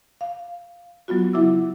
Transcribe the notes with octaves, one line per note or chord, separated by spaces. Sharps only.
F5
F#3 B3 F4 F#4
C#3 F#3 E4 E5 D6 E6